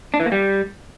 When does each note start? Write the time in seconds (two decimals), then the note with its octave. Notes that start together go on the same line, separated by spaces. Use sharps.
0.14 D4
0.20 E3
0.26 A#3
0.32 G3